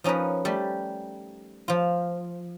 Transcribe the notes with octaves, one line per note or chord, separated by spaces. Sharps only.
F3 C#4 D#4 A#4 B4
G3 A3 G4
F3 F4